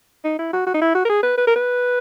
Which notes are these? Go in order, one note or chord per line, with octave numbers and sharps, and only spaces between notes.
D#4
E4
F#4
F#4
D#4
E4
F#4
A#4
G#4
B4
B4
A#4
B4